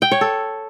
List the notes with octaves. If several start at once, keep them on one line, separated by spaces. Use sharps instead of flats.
G5
C#5
A4